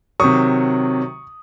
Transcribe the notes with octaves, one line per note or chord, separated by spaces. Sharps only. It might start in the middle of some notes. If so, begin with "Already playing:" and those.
C3 D#3 F#3 C#6 D#6